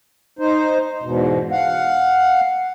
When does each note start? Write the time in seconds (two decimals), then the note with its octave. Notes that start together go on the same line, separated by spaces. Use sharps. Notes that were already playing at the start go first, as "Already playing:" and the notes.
0.39 D#4 C5
1.02 E2 G#2 B2
1.51 F5 F#5